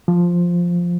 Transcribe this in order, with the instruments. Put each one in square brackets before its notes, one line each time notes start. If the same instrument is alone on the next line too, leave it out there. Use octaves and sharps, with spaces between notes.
[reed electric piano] F3